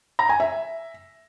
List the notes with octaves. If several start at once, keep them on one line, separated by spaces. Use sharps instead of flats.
A#5
G#5
E5